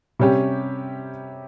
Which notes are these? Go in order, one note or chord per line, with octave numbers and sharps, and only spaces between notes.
C3 G3 C#4 G4